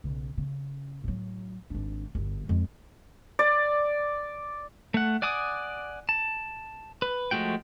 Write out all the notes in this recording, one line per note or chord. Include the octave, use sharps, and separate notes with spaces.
B1 C#3
C#3
A2 F#3
G#1 D4
G1 F#2
F2 G#3
D5
A3 F#5
D5 F#5 G#5 D6 D#6
A5
B4
F3 G#3 A3 F#4 G5